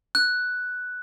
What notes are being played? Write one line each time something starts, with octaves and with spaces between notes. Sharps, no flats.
F#6